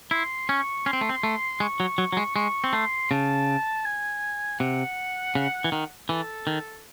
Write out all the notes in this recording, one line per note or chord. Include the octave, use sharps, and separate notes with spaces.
E4 C6
C#4 C#6
C#4 C6
C4
A3
C4
A3
G#3 C#6
F#3
F#3
F#3
G#3
G#3 C#6
C4
A3 C6
C#3 A5
G#5
C3 F#5
C#3
E3
D#3
E3 A4
D#3